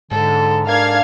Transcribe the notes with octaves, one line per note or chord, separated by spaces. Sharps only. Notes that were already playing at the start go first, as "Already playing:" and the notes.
G#2 D3 A4
D4 A#4 F5 G#6